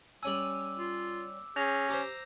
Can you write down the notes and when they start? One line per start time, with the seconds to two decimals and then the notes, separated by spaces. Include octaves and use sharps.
0.23 G3 C#4 G#5 D6 E6
0.77 F4
1.56 C#4 G#4 G6 A#6 F7
1.89 G4 C5 A#5 D6